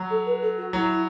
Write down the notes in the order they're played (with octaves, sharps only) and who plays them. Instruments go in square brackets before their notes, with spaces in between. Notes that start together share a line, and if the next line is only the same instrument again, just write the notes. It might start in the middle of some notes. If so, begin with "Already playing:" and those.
Already playing: [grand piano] F#3
[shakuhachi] A4
B4
A4
F#4
[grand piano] F#3 [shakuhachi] E4